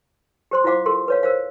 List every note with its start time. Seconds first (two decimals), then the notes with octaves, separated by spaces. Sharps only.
0.51 G4 C5 C6
0.64 E4 F4 C5 F5 F#5 D6
0.86 G4 A4 A#4 C6
1.08 B4 C#5 F5
1.23 A#4 C5 F5